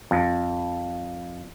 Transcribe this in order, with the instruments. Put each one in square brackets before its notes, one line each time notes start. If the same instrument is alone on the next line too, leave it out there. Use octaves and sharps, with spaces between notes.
[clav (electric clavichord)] F2